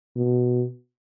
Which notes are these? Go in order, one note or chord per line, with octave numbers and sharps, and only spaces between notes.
B2